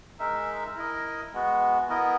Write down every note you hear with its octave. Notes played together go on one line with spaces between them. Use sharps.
G#3 D#4 A#4 E5
E4 A#4 D#5
G#3 B3 F#4
B3 E4 A#4 D#5